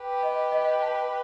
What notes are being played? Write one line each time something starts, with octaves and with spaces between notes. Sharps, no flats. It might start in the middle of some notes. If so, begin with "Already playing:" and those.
Already playing: G4 B4
D#5
D#5
A5